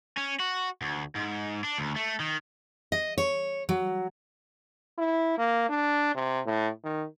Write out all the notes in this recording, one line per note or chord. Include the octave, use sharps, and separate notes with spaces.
C#4
F#4
D2
G#2
D4
D2
A3
D#3
D#5
C#5
F#3
E4
A#3
D4
C3
A2
D#3